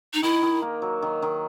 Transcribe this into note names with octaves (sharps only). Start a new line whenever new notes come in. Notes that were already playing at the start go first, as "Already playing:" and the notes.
D#4
D#3 E4
D#3
A#3
F#3
D#3
D#3